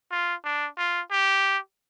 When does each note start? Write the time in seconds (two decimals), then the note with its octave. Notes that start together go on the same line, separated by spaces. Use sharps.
0.11 F4
0.44 D4
0.78 F4
1.11 G4